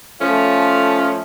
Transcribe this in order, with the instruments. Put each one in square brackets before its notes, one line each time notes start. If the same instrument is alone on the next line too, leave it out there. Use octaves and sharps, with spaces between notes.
[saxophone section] F3 A3 C#4 F4 A4